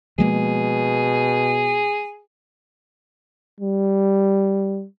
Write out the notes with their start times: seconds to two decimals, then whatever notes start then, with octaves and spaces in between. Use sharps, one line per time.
0.18 B2 F3 G#3 A#3 G#4
3.60 G3